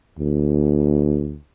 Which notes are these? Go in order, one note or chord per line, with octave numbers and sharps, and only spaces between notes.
D2